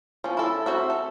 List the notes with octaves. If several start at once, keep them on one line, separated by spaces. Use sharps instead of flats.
F3 C#4
E4 A4
C4 F#4 E5
A4